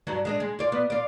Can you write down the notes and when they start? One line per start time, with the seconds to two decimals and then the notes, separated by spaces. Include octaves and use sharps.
0.07 G2 F#3 D4
0.25 G#3 D4 D#5
0.40 G#3
0.59 F4 D5
0.72 B3
0.90 F4 D5